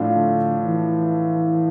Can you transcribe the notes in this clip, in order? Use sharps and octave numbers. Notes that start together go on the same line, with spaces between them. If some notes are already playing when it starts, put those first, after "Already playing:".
Already playing: A2 F3 A3 D4 F4
D3
E3